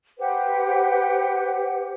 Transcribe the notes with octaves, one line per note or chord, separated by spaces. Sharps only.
G4 B4 C5 F#5